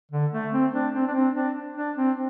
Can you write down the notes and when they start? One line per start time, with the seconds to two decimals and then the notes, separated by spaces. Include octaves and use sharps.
0.11 D3
0.32 A3
0.52 C4
0.73 D4
0.94 C4
1.07 D4
1.14 C4
1.35 D4
1.76 D4
1.97 C4